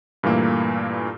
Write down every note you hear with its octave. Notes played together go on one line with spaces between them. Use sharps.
G2 A#2 E3 A3 A#3